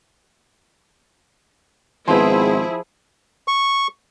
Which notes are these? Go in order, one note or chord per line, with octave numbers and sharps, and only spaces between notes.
G#1 F3 B3 E4 F4 G#4 C6
C#6